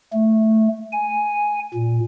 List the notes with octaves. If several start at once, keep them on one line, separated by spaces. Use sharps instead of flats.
A3
G#5
A#2